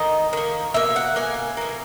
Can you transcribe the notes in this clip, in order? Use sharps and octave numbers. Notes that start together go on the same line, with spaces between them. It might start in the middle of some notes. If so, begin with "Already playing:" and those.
Already playing: D#3 A#3 D#5
D#3 A#3
B2 A#3 E5
F#5
B2 A#3 G#5
B2 A#3